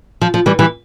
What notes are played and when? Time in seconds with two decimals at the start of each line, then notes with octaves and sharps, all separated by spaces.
0.21 F3
0.34 F3
0.46 E3 G3
0.59 E3 G3